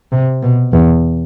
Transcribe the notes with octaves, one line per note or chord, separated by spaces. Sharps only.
C3
B2
E2